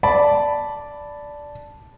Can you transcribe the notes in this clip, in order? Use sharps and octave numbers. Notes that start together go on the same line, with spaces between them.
D5 A5 B5